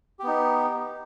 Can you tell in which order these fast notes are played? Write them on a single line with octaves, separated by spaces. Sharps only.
G4 B3 D#4